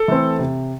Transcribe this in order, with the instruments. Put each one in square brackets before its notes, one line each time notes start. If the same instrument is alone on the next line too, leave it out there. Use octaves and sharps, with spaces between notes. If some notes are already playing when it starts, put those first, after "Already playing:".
Already playing: [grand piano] A4
E3 A3 C4
C3